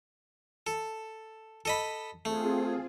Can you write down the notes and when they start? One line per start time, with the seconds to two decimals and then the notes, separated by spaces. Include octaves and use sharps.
0.67 A4
1.65 A4 D#5 B5
2.25 A3 C4 F4 G#4